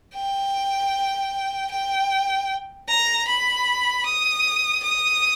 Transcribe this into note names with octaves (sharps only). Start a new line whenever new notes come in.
G5
G5
A#5
B5
D#6
D#6